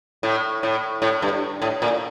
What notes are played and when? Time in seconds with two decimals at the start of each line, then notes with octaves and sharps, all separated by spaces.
0.23 A2
0.63 A2
1.02 A2
1.22 G2
1.62 A2
1.82 A#2